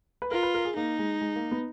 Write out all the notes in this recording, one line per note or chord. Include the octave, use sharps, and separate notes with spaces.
B4
F4 A#4
B4
A#4
G#4
A#3 D#4
G#3
G#3
A#3
B3